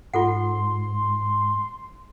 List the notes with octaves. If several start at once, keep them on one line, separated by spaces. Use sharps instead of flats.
G#2 F4 A4 F#5 C6